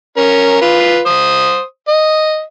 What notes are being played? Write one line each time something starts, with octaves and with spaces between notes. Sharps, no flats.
C#4 A#4
F4 B4
C5 D#6
D#5